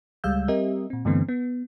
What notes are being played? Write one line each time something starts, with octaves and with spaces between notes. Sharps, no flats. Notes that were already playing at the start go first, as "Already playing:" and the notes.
C#2 G3 G#3 F5 E6 G6
G3 C4 G4 A#4 D#5 E5
A#2 C4
G2 D3 E3 A3 B3 C4
B3